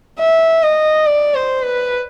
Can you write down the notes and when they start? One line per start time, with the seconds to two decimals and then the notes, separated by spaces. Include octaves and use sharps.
0.19 E5
0.63 D#5
1.06 D5
1.34 C5
1.64 B4